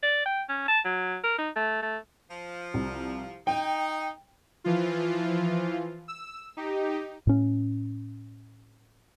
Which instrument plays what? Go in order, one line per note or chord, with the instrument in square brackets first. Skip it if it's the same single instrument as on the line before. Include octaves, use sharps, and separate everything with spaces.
[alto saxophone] D5
G5
C#4
A5
F#3
A#4
D#4
A3
A3
[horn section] F3
[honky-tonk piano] C2
[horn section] D#4 [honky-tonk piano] G5
[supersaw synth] E3 F3 F4
E6
D#4 G4
[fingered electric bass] A2 C#4